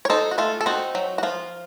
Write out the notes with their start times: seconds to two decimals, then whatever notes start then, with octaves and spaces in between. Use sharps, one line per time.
0.05 C#5
0.10 D#4 A4 C5
0.31 F#4
0.38 A3 F4 A4
0.61 A4
0.66 C4 D#4 F#4
0.95 F#3
1.18 F#4
1.23 F3 F4